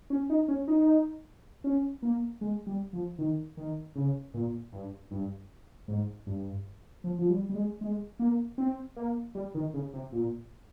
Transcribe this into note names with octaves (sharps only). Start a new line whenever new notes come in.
C#4
D#4
C#4
D#4
C#4
A#3
G#3
G3
F3
D#3
D#3
C#3
A#2
G2
G2
G#2
G2
F3
F3
G3
G3
G#3
G#3
A#3
C4
A#3
G3
D#3
C#3
C3
A#2